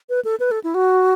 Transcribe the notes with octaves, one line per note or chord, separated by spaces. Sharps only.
B4
A4
B4
A4
E4
F#4